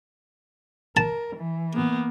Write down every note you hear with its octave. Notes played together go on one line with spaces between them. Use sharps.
A#4 A5
E3
A#3 B3